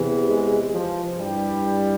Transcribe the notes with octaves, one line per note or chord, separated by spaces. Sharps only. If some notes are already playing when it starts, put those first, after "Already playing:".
Already playing: E2 C3 E3
G#3
F3
G2 E3 G3